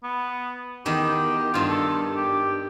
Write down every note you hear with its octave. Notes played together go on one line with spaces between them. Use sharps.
B3
E2 D#3 G4
G2 D#3 F4
A4
G4